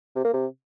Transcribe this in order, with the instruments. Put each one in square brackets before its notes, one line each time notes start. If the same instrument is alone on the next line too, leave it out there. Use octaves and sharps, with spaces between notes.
[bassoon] C3
A#3
C3